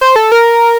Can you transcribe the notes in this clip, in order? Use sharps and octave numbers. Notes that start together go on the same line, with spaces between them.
C5
A4
A#4